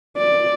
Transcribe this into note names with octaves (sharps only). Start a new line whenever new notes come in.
D5